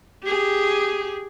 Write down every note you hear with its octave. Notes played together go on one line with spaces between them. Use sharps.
G4 G#4